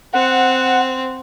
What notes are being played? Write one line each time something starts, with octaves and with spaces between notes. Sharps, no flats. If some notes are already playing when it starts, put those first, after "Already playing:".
C4 F#5